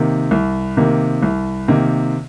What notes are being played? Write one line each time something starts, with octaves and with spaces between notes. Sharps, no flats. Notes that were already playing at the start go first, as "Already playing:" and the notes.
Already playing: C3 D#3 A#3
C2
C3 D#3 A#3
C2
C3 D#3 A#3